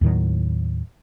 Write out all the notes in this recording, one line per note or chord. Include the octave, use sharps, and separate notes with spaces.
D#2 A2 D#3 F#3